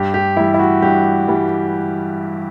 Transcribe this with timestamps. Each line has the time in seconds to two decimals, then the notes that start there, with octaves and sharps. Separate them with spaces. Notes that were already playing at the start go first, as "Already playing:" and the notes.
Already playing: G2 G4
0.14 G4
0.36 E3 G3 E4
0.54 E4
0.59 F#4
0.82 G2 G4
1.28 E3 G3